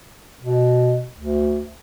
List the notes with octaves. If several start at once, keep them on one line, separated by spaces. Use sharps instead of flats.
B2
D2